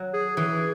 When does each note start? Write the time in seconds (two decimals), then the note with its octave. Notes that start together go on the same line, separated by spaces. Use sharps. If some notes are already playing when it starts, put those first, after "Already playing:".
Already playing: F#3
0.14 G#4
0.37 E3 G#4